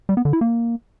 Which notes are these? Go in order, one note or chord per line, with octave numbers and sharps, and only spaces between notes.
G3
B3
D3
E4
A#3